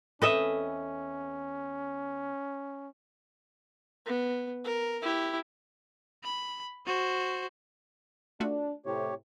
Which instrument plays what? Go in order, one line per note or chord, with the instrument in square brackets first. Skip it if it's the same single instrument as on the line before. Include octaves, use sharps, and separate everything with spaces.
[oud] E2 C4 A4 [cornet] C#4 [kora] B4 D#5 E5
[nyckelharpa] B3
A#4
E4 G4
[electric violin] B5
F#4 C5
[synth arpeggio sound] A3 F4 F#4 [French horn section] D4
[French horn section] A2 C3 [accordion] G4 C#5